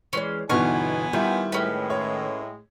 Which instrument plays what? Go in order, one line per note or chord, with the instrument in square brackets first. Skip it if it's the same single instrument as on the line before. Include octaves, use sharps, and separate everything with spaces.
[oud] E3 G#3 C#5 [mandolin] C#4
[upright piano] G1 B2 E3 [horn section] B3 G#5 [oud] D#4 [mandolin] C#6 F6
[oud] D#3 F4 [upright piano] G3 E4
[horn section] A2 G#3 [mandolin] C#4 B4
[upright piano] C#5